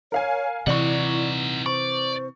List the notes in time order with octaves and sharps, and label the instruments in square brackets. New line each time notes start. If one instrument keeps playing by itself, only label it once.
[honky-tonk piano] A#4 F5 G#5 [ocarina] C#5
[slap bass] C3 E3 [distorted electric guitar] D#4 F#5 [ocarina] E4 [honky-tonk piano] D5 C#6
[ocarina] C5 [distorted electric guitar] D5 [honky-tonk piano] C#6